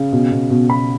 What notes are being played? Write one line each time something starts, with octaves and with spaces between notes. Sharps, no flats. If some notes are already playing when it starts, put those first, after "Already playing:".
Already playing: C#3
B2
B2
B2
B2 B5